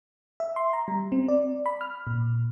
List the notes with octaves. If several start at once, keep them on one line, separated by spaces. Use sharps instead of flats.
E5
C6
A#5
G3
C4
D5
B5
F6
A#2